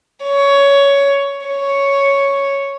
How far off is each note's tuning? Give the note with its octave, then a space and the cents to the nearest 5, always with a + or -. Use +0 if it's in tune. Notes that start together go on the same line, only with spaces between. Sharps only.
C#5 +15
C#5 +0